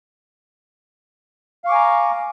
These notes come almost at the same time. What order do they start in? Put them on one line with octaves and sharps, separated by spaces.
F5 C#6 D6 G#5 A#5